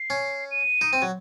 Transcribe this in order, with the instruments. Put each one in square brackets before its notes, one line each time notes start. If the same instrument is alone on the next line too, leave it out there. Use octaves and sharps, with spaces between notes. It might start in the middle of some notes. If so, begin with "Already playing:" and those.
Already playing: [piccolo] C7
[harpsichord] C#4
[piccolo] D#7
[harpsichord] D#4
C4
F#3